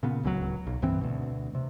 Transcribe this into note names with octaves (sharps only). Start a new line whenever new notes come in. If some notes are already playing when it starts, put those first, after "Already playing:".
A#2 C#3 B3
D1 C#2 C#3 F#3
B1
C2 G2 E3 C4
D2 B2
C3